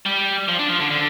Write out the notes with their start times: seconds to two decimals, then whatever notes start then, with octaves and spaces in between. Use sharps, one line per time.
0.06 G3
0.48 F3
0.59 D4
0.69 F3
0.80 D3
0.91 D3